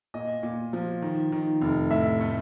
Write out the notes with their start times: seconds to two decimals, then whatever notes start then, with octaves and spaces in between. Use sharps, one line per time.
0.14 A#2 D#5
0.43 A#2
0.73 F3
1.02 D#3
1.32 D#3
1.61 F1
1.91 A2 E5
2.20 A3